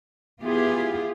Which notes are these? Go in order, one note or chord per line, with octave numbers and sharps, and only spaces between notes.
B3 E4 F4 G4 G#4